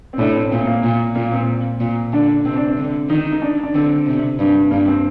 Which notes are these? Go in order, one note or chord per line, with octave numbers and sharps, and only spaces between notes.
C4
A2 D4
C4
A#2 C4
A#3
A#2
A#2 A#3
C4
A#2
D3 D4
C3 C4
D4
C4
D3
D#3 D#4
D#4
D4
D4
D3 C4
C3
G2
G2 A#3
C4